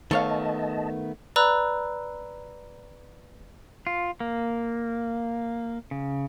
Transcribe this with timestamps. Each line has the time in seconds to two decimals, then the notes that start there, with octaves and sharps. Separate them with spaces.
0.11 D#3 A3 B3 A4 C#5 D#5 F5 A5
1.36 B4 D5 A#5 B5 E6 F#6
3.87 F4
4.20 A#3
5.91 C#3